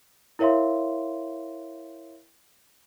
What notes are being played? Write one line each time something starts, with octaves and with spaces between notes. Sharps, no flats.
E4 A#4 C#5 E5 F5 C6